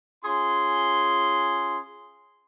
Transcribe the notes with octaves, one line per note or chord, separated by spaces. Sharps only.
C#4 F4 G#4 C6